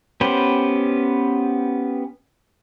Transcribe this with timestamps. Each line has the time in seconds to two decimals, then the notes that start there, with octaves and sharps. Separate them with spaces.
0.21 B3 C#4 G4 B4 C5